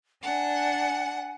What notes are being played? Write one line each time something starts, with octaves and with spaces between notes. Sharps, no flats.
D4 F#5 G#5